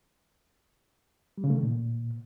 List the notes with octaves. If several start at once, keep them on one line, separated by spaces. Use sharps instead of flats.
G3
C#3
A3
D#3
A#2